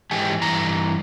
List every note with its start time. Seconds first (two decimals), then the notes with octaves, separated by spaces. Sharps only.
0.11 G#2 E3 D#4 G4 G#5
0.42 G2 E3 A#5